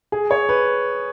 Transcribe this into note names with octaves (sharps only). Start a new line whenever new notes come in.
G#4
C#5
B4